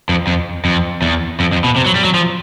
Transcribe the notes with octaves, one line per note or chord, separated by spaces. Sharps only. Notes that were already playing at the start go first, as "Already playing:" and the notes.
F2
F2
F2
E2
F2
F2
B2
C3
F#3
G3
F#3
F3